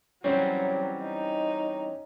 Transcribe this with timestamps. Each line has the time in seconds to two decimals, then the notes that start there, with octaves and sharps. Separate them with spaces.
0.24 E3 F#3 G3 C4 C#4
1.04 D#4